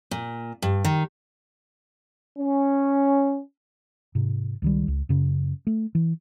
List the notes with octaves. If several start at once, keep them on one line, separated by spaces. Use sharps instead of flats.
A#2
G2
D#3
C#4
G#2 C3
C#2 D#3 G3
C#2
F#2 C#3
A3
E3